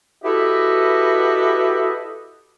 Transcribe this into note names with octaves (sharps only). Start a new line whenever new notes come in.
E4 F#4 G4 A4 B4 D#5